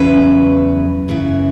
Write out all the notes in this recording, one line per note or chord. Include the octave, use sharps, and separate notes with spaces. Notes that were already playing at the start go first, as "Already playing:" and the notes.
Already playing: E2 C#3 F#3 E4 B4
F#2 C#3 E3 B3 E4